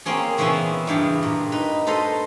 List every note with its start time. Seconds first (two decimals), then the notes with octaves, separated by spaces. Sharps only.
0.05 A#3 C4 C#4 G#4
0.37 A#2 C#3 E3 B3 C#4 E4
0.87 E2 G2 G4 E5
1.23 A#2
1.52 D#4 B4
1.87 A4 B4 C5 D#5 A#5